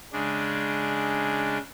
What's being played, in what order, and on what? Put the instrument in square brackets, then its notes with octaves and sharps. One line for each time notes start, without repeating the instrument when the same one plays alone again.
[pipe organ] C#3 G#3 D4